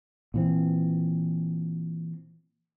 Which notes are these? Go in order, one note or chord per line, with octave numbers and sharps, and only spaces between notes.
A#2 E3 C4